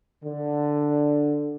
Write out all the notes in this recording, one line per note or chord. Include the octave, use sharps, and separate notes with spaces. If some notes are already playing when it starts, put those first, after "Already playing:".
D3